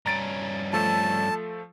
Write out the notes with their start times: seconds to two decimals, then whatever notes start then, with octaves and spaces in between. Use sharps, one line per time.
0.06 G2 C#4 A#5 A6 D7
0.73 F3 A3 A4 A5